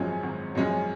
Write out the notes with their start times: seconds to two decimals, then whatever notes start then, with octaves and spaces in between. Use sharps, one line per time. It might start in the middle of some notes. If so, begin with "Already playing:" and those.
Already playing: G#1 F#2 F3 G#3 C#4
0.23 G#1
0.55 F#2 F3 G#3 C#4